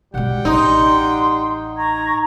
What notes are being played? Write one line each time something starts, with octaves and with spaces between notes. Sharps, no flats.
B2 G3 G#3 F#5 G5
A1 D#4 C6
A#5 C#6 G#6